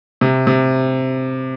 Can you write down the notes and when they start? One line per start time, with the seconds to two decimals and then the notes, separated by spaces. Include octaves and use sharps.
0.21 C3
0.47 C3